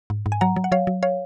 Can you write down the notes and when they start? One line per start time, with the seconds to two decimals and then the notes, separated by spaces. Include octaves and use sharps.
0.10 G#2
0.26 G#2
0.32 G#5
0.41 F#3 F#5 A#5
0.56 F#3
0.64 F#5
0.72 F#3 C#5 F5
0.87 F#3
1.03 C#5 F5